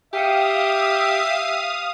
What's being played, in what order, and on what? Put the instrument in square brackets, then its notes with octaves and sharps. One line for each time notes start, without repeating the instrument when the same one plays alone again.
[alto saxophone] G4 [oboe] E5 [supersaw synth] F5 D#6 [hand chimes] G5 C#7